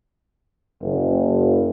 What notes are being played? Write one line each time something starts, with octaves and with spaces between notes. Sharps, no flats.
F#1